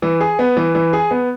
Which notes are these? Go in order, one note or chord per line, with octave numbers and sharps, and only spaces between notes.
E3
G#4
B3
E3
E3
G#4
B3